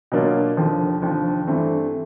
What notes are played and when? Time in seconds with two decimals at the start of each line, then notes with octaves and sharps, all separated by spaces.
0.12 B2 F#3 A#3 D4 F4
0.57 F1 D#2 D3 F3
1.02 F1 D#2 D3 F3
1.47 G2 E3 A3 C4